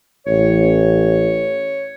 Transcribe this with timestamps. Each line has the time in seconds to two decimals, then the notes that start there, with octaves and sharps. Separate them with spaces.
0.26 A1 C#5